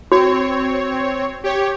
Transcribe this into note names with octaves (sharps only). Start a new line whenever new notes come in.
C4 F#4 C#5
G4 C#5